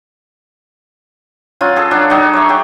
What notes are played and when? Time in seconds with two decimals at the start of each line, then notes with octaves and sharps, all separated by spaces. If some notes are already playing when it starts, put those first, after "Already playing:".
1.61 F#3 C#4 F4
1.76 G#4 A4
1.91 F#3 D4
2.10 F#3 D4 D#4
2.33 C#5 E5
2.49 F#4 G4